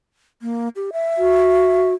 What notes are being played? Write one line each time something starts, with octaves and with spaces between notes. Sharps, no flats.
A#3
G4
E5
F#4